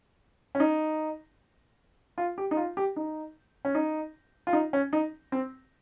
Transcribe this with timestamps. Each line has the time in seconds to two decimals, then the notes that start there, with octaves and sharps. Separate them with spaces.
0.55 C#4
0.60 D#4
2.18 F4
2.38 G4
2.51 D#4
2.57 F4
2.77 G4
2.96 D#4
3.65 C#4
3.75 D#4
4.47 F4
4.53 D#4
4.73 C#4
4.93 D#4
5.32 C4